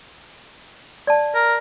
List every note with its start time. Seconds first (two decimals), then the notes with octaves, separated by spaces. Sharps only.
1.07 D5 A5
1.35 A#4